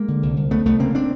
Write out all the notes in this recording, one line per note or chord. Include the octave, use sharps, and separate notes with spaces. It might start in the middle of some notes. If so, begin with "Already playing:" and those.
Already playing: G#3 A#3
D3
C2
C2
C2 A3 B3
C2 A3 B3
C#3 A#3 C4
C4 D4